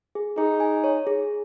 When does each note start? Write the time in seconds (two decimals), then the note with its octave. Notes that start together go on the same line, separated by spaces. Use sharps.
0.15 G#4
0.38 D#4 G#4
0.60 G#5
0.84 C#5
1.07 G#4